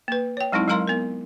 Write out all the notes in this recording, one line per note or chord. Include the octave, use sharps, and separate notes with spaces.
A#3 B4
C#5 G5
F#3 G#3 C4 D#4 E4
F#3 G#3 A#4 F5 A#5 C6
B3 A#4